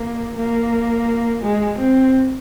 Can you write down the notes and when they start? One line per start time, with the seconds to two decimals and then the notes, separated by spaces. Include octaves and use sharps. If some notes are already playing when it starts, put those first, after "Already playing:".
Already playing: A#3
0.36 A#3
1.43 G#3
1.79 C4